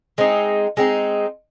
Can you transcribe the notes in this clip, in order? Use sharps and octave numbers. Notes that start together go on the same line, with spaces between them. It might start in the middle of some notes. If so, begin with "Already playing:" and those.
G#3 C4 D#4
G#3 C4 D#4